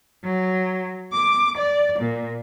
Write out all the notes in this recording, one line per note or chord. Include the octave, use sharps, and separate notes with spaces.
F#3
D6
D5
A#2